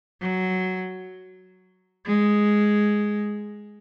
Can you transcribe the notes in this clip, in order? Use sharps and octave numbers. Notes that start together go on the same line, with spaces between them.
F#3
G#3